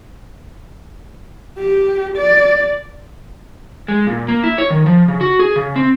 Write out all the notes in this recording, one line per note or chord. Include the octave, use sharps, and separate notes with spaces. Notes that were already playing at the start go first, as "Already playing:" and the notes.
G4
D5
G#3
A#2
A#3
E4
C#5
D#3
F3
C#3
F#4
G#4
C#3
C4